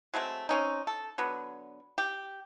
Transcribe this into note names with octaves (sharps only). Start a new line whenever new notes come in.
F#3 G#3 A3 C4
C4 C#4 D#4
A4
D3 F#3 B3
G4